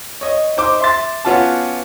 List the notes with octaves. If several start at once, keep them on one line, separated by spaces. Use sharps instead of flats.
C#5 D#5
D#4 C5 D6
E5 C6 A6
B3 C#4 F4 F#4 A5